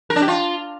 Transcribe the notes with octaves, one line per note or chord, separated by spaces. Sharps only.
A#4
D4
G4
F4